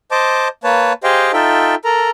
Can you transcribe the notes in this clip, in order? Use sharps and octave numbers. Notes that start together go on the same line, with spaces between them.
C5 D#5 A5 D6
A#3 B4 C#5 A5
G4 G#4 C5 D#5 F5 G5
D#4 F4 A4 E5 G5
A4 A#4 A#5